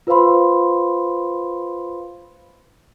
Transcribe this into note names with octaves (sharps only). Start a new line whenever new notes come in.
F4 B4 C5 F5 B5 C6